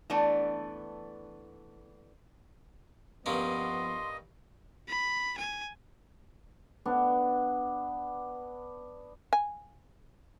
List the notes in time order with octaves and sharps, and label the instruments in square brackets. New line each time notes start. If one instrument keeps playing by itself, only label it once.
[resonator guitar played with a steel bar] E3 A3 B3 D4 D5
[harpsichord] G2 A#3 C#4 [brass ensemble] F3 B3 [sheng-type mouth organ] D#5 [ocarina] C6
[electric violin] B5
G#5
[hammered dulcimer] B3 D4
[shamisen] G#5